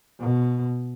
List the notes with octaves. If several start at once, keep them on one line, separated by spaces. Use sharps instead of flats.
B2